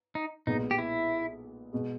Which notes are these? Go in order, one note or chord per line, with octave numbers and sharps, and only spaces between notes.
D#4
B1 A#2 G#3 B3 D#4
G4
E4
B2 G#3